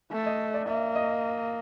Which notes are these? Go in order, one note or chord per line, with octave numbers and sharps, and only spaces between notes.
A3
D#5
D5
A#3 E5
D#5